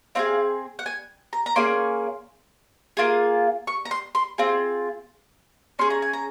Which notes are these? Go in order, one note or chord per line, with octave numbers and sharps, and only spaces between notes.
C4 F4 G#4 F5
F#5
G#5
A#5
A#5
A#3 C#4 G#4 C6
A#3 F4 G#4
C#6
A#5
C6
C6
C4 F4 G#4
C#4 G#4 C6
A#5
G#5
A#5